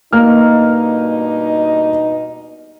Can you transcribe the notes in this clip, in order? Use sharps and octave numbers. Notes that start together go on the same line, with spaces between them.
G2 B2 A#3 D#4 F6